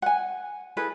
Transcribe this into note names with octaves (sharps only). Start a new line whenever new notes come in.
F#5 G#5
E4 G#4 A4 B4